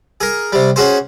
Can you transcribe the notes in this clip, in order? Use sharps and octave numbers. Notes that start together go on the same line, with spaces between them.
G#4 A#4
C3 G3
C#4 F#4 G#4 C5